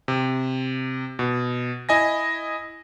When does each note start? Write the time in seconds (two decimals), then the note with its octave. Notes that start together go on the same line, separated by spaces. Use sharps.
0.08 C3
1.19 B2
1.89 E4 D#5 G#5 A#6